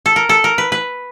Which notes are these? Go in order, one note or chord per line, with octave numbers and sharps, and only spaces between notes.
A4
A#4
A4
A#4
B4
B4